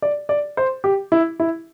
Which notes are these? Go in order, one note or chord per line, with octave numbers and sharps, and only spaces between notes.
D5
D5
C5
G4
E4
E4